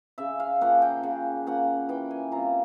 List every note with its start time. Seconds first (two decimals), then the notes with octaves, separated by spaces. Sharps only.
0.18 C#3 E5
0.40 F5
0.61 F3 A#3 C#4 F#5
0.82 G5
1.03 C#3 F#5
1.47 F3 A#3 C#4 F#5
1.89 E3 G5
2.11 G#5
2.32 G3 C4 F4 A#5